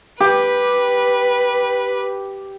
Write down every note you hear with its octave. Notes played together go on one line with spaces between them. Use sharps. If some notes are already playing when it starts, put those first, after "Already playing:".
G4 B4